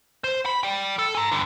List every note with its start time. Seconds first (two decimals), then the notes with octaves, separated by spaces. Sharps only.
0.24 C5
0.46 B5
0.63 D5 G5
0.99 A4
1.15 G#5 A#5
1.32 G2 D3